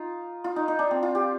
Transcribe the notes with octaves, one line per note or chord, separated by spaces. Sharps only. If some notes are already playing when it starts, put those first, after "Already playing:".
Already playing: D#4 F4
F4
D#4
D#4
D4
C4
F4
G4